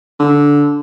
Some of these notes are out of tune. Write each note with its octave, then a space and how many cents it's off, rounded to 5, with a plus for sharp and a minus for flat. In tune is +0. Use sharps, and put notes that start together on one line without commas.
D3 -15